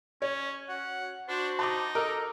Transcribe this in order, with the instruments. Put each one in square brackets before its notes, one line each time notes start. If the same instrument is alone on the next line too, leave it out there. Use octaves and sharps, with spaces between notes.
[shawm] C#4 [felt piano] C#5
[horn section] C#4 F#4 [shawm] F#5
[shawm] D4 [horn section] F#4 C5
[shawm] D#4 [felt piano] A5 D6
[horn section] A4 D#5 [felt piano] A#4